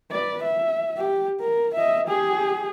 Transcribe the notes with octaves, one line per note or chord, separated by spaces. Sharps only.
B4 D5
E5
G4
A#4
D#5 E5
G4 G#4